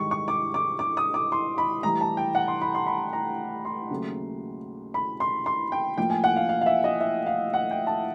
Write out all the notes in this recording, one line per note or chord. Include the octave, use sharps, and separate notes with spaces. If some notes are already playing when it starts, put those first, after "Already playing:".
Already playing: G#2 D#3 G3 C#6
C#6
D6
D6
D6
D#6
D6
C6
B5
A2 E3 G3 A#5
A5
G5
F#5
C6
B5
C6
B5
A#5
C6
D#2 C#3 F#3 A3
B5
C6
C6
G5
A2 F3 A#3 G5
G#5
F#5
F5
F5
F5
E5
D#5
E5
F5
F#5
G5
A5